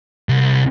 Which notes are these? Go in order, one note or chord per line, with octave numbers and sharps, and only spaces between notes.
C2